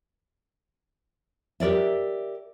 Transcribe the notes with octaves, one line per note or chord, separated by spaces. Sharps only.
G4 A#4 D5 E5